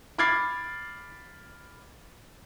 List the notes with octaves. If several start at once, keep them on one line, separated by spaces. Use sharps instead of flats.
B5 D6 F6 G#6 A6 C7